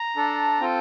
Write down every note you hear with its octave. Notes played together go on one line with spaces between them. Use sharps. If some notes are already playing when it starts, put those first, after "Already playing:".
Already playing: A#5
D4 A4
C4 F4 A4 G5